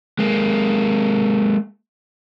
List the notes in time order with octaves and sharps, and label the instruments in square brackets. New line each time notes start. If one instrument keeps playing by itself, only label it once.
[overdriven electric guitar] G#3 A#3